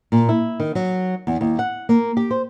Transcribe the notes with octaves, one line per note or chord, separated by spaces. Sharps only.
A#2
E4
D#3
F#3
E2
D#2
F#5
A#3
G4
C5